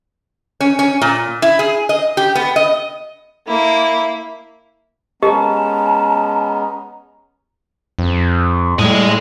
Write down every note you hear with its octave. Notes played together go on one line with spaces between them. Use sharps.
C#4
C#4
A#2
E4
G#4
D#5
G4
B3
D#5
A#3 E4
G#3 B3 C#4 G4 A#4 D#5 A5 A#5
F2
A2 G3 G#3 D#5